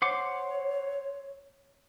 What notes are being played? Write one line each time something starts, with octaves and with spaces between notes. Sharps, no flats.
C5 C#5 F#5 D6